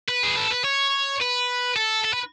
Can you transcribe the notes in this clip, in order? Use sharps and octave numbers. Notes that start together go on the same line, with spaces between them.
B4
G#4
A4
B4
C#5
B4
A4
A4
B4